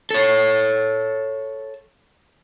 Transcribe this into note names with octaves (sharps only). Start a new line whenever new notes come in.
A4 C#5